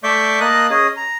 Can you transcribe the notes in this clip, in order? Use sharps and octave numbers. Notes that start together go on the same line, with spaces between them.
A3 D5 E5 C#6 D6 G6
A#3 A#4 D#5 A5 D#6 F#6
C#4 G#4 D#5 D#6
A#5